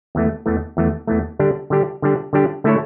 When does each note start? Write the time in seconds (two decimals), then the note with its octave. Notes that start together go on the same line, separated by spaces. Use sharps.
0.15 E2 E3 A3
0.46 E2 E3 A3
0.77 E2 E3 A3
1.07 E2 E3 A3
1.39 D3 G3 D4 G4
1.70 D3 G3 D4 G4
2.02 D3 G3 D4 G4
2.33 D3 G3 D4 G4
2.64 D3 A3 E4 A4 C#5